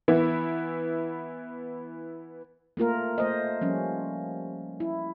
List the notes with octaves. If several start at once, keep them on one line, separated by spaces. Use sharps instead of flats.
E3 B3 E4
A3 A#3 F4 A#4
A3 C5 D#5
F3 G3 C#4
E4